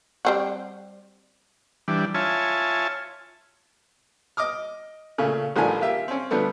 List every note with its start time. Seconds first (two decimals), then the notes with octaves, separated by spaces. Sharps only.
0.25 G3 C4 F#4
1.88 E3 G3 D4
2.14 F4 C#5 E5 G#5 A5
4.37 D#5 D6 D#6 F6
5.18 A#2 C#3 A3
5.56 A1 D#3 F3 A3 D4 G#5
5.81 A#3 F4 G4 E5
6.08 C4 C#4
6.31 D3 F3 G3 A3 B3